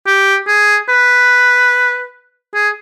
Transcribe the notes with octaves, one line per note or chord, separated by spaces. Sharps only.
G4
G#4
B4
G#4